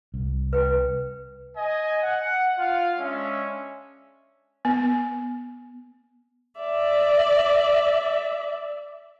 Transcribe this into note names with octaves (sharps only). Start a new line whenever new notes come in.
C2
B4 G5
D#5 G#5
F#5
F4 F5
G#3 C#4 D4 C#5 E5
B3
D5 E5